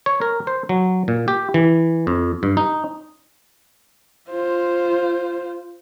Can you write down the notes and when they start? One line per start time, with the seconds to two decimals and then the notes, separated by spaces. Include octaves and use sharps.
0.06 C#5
0.21 A#4
0.47 C5
0.69 F#3
1.08 A#2
1.28 G4
1.54 E3
2.07 F2
2.43 G2
2.57 D#4
4.30 F4 C5